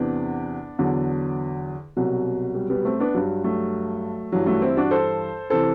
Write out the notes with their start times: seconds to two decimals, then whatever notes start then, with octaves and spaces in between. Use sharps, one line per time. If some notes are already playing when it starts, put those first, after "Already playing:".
Already playing: E2 C3 E3 B3 D4
0.79 E2 D3 F#3
1.96 C2 B2 F#3
2.55 G3
2.70 G3 B3
2.85 A3 C4
3.00 B3 D4
3.14 G2 F#3
3.44 F#3 A3
4.32 G2 E3 F#3
4.46 F#3 A3
4.62 C4 E4
4.77 D4 F#4
4.91 A4 C5
5.50 C3 E3 A4 C5